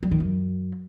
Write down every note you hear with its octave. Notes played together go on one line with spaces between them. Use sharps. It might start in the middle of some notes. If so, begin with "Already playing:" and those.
G3
D#3
F#2